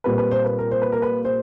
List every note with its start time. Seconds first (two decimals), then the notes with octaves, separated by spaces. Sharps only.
0.04 A#2 G3 C4 B4
0.18 B4
0.31 C5
0.45 B4
0.59 A#4
0.71 C5
0.82 B4
0.92 A#4
1.02 B4
1.25 C5